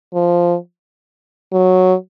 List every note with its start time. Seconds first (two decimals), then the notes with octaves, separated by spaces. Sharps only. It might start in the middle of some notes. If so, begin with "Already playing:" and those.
0.14 F3
1.53 F#3